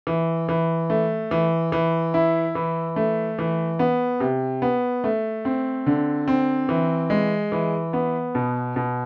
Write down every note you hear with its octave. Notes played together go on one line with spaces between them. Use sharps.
E3
E3
A3
E3
E3
E4
E3
A3
E3
B3
C3
B3
A3
C4
D3
C4
E3
G#3
E3
B3
B2
B2